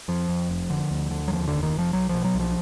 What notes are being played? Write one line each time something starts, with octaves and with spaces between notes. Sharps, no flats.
F2 F3
F2
F1
D3
D2
D3
F#3
D#2 F3
F1 D3
D#3
F1
F3
B1 F#3
B2 F3
F#3
B1 F3